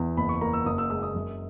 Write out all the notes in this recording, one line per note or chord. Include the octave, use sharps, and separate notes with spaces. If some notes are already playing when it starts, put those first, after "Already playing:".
Already playing: E2
F#1 B5
C#6
A#3 A#5
E6
F#1 D#6
E6
G#3 E6
D#6
F#2